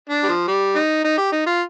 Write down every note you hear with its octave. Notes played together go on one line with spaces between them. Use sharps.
D4
G3
F3
G3
D#4
D#4
G4
D#4
F4